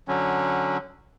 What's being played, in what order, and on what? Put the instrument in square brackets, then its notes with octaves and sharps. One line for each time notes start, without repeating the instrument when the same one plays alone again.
[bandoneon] D3 F#3 C#4